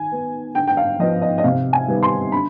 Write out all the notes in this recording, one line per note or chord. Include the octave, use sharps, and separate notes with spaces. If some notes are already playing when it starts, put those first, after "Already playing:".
Already playing: D#3 G#5
B3
D3 G5
G5
F5
F3 B3 D#5
D#5
D#5
C3 F5
G#5
D#3 G3 B3
C6
D3 B5